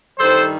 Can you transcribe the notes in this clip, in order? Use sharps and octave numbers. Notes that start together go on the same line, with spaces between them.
G2 D#3 G3 A4 C5